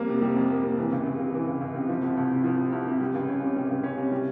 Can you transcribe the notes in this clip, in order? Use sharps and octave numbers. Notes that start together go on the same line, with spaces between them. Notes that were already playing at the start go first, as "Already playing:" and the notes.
Already playing: F2 G3 A#3
C3
G3
F2
A#3
C3
E3
C#2
C#2
C3
E3
C#2
C#2
C3
F3
C2
C2
C3
F3
C2
C2
C3
G3
C#2
C#4
C3
G3
C#2
C#4
C3
G3